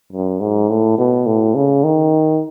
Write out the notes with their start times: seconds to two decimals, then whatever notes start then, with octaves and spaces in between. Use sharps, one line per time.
0.12 F#2
0.40 G#2
0.69 A2
0.98 B2
1.26 A2
1.55 C#3
1.84 D#3